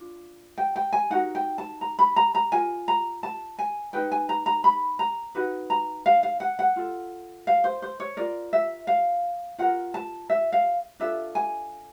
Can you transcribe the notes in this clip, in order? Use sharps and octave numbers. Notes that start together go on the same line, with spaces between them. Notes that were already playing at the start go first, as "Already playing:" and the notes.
Already playing: D4 F4
G5
G5
G#5
D#4 F#4 A#4 F#5
G5
A5
A#5
B5
A#5
A#5
F4 A#4 G#5
A#5
A5
G#5
D#4 G#4 B4 G5
G#5
A#5
A#5
B5
A#5
D#4 F#4 B4
A#5
F5
F5
F#5
F#5
F4 A4
F5
C5
C5
C#5
F4 A#4 D5
E5
F5
F4 A#4 F#5
A5
E5
F5
D4 F4 A4 E5
G#5